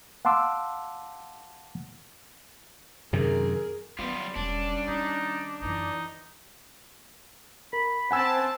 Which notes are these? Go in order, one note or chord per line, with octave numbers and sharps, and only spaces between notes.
F5 F#5 A5 C6 D6 E6
F#2 C3 D#3 G#4 A#4
F#3 G3 B3 F4
E1 G3 C#4 D4
D#3 D#4
F#2 E3 F#3 D#4
A#4 B5
C4 F#5 G#5 A5 E6